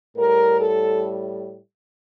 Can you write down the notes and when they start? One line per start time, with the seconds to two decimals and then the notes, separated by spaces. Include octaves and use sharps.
0.16 A2 G3 A#4
0.60 A4